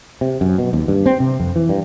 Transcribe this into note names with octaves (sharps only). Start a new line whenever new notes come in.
C3
F#2
B2
D#2
G2
C4
C3
F2
E3
G2